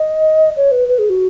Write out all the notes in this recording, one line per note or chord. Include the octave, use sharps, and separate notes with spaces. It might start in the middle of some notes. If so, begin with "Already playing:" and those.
Already playing: D#5
C#5
B4
B4
G#4
F#4